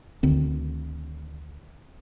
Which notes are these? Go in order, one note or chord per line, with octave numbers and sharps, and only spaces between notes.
D2 D3 D#3 C4